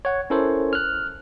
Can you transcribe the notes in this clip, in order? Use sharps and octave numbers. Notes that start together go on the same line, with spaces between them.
C#5 F#5
C#4 E4 A4 A#4 C5 C#5
F6 F#6